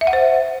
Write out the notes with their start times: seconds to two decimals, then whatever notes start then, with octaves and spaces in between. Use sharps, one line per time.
0.01 E5
0.07 F#5
0.13 C5